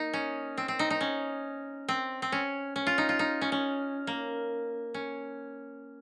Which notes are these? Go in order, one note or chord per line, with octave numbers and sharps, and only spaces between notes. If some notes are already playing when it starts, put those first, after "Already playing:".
Already playing: A#3 D#4
C#4
C4
C4
D#4
D#4
C#4
C4
C4
C#4
C#4
F4
D#4
F4
D#4
C#4
C#4
A#3
C#4